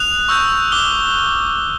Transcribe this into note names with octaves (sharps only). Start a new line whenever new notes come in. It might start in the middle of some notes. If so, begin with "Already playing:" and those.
Already playing: D#6 F#6 F7
C#6 E6 G6
D6 F6 G7
G7